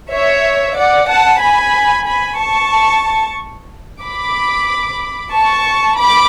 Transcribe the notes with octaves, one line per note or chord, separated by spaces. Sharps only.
C#5 E5
D5 F#5
F#5 A5
G#5 B5
G#5 B5
A5 C#6
B5 D6
A5 C#6
B5 D6